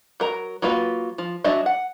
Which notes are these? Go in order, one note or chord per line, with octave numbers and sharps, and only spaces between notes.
F#3 A#4 A#5
F#3 A#3 F4 B4
F3
F#3 D4 G#4 D#5 E5
F#5